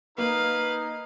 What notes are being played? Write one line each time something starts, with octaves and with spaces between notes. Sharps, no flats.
A#3 D#4 B4 F5